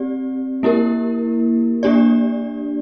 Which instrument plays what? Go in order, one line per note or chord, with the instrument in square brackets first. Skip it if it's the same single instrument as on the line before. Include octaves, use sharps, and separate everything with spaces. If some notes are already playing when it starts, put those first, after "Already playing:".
Already playing: [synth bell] C4 G4 D5
A#3 E4 G4 A#4
A#3 D4 G4 D5